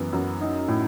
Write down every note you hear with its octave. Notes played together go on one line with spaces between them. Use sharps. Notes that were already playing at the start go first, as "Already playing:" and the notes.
Already playing: F#2 E3 B3
F#2
D#4
A2